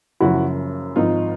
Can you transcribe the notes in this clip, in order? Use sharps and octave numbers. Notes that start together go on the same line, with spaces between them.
F#1 F#2 C#3 F3 E4 F#4
G#1 G#2 F3 D#4 F4